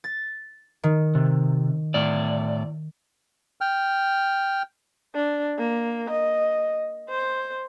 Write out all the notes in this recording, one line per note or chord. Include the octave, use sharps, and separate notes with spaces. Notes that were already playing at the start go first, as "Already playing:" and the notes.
A6
D#3
C3
A2 D5
G5 F6
D4
A#3
D#5
C5